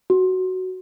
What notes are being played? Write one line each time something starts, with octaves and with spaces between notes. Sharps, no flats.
F#4